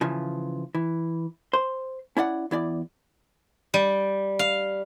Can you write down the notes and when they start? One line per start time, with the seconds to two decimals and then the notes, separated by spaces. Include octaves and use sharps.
0.01 C#3 E3 F3
0.75 E3
1.53 C5 C6
2.17 C#4 E4 D5 F#5
2.51 E2 E4 D5
3.74 G3
4.39 F5